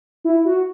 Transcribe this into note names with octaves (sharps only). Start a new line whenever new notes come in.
E4
F#4